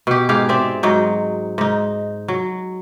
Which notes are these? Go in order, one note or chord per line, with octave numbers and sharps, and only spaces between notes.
B2 G4
G#2 G4 G#4 F5
C4 D5 E5
G#2 F#3 D#4
G#2 D#4
F#3